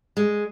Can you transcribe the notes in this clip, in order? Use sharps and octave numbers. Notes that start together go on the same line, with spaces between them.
G#3